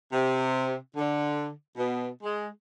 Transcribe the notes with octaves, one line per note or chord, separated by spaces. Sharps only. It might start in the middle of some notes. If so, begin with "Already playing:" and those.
C3
D3
B2
G#3